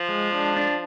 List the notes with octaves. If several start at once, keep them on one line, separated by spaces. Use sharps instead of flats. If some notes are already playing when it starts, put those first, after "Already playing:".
Already playing: F3
G#3
D4
D4